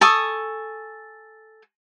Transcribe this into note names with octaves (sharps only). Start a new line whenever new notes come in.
A4 G#5 C#6 D#6